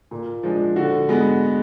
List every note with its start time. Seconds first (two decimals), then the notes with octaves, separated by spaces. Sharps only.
0.11 A#2
0.43 F3 G#3 D4
0.76 D3 F#4
1.09 G#3 B3